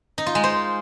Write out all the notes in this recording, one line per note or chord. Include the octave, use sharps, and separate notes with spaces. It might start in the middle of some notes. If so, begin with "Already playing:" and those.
D#4
F4
G#3
C5